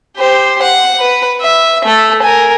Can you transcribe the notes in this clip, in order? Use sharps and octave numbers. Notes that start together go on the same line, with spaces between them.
G4 C5
F#5
B4
E5
A3 A4
A#4 G#5